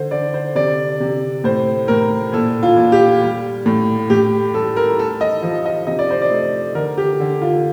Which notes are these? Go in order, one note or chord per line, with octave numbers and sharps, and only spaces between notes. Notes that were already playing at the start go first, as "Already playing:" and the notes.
Already playing: D3 C5
D3 D5
C5
C3 D5
C3
A2 C5
A2 A#4
A#2 A4
F4
A#2
G4
G3
A2
A2 G4
G3 A4
A#4
A3 A4
D#5
F3
D#5
C3 D#5
D5
C5
D5
A3
D3 A#4
G4
D3
F4